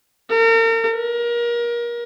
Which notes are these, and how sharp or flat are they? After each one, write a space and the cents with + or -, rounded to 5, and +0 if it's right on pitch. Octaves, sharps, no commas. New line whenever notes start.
A#4 -40
A#4 +30